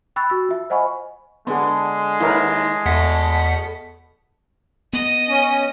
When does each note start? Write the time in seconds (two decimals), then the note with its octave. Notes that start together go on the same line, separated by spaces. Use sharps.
0.16 G5 B5 C#6 E6 F#6 A6
0.30 F#4 E6
0.49 F4 E5
0.70 C5 D#5 F#5 G#5 B5 C#6
1.47 D3 G#3 B3 G#4
2.20 D#2 E4 A#4 B4
2.86 E2 B2 A3 F#5 B6
4.93 B3 D#5
5.29 C#4